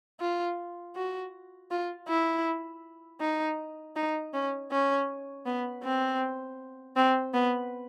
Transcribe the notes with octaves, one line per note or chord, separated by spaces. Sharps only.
F4
F#4
F4
E4
D#4
D#4
C#4
C#4
B3
C4
C4
B3